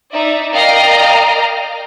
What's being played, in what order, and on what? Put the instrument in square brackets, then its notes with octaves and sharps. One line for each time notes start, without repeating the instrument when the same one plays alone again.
[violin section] D#4 D5 E5
A#4 D5 D#5 F5 G5 A#5